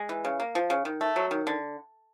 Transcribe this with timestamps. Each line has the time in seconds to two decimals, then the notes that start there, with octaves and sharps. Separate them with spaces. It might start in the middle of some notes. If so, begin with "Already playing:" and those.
Already playing: G#3
0.09 E3
0.25 C#3
0.40 A#3
0.55 F3
0.70 C#3
0.85 D#3
1.01 A3
1.16 F#3
1.31 D#3
1.47 D3